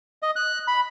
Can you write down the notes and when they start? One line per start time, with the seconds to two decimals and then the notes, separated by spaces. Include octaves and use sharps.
0.23 D#5
0.36 F#6
0.68 B5